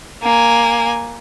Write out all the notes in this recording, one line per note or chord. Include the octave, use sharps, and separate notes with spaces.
A#3 G#5